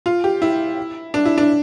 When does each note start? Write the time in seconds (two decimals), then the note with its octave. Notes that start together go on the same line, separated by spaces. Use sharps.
0.06 F4
0.24 G4
0.42 E4
1.14 D4
1.25 E4
1.38 D4